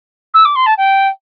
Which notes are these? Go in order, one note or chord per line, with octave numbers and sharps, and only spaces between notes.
E6
D6
C6
A5
G5